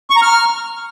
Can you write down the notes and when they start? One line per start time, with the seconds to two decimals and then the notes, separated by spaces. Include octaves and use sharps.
0.10 C#6
0.16 A#5
0.22 F6